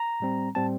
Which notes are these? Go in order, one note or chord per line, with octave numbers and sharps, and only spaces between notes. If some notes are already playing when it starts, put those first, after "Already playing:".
Already playing: A#5
A2 G3 C4
A2 G3 C4 A5